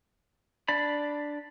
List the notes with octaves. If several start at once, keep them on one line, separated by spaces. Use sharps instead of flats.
D4 D5 B5